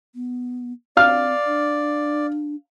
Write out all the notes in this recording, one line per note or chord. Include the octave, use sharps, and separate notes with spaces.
B3
C4 D5 F5 F6
D4